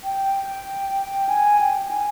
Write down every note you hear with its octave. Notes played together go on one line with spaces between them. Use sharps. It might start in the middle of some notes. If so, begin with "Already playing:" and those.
G5
G#5
G5
G5
G#5